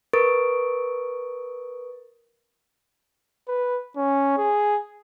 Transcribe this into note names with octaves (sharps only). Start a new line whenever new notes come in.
A#4 B4 C#6 D#6 A6 D7
B4
C#4
G#4